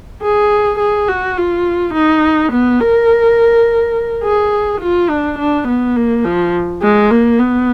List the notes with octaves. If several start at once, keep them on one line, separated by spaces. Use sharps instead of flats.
G#4
G#4
F#4
F4
D#4
B3
A#4
G#4
F4
D4
D4
B3
A#3
F3
G#3
A#3
B3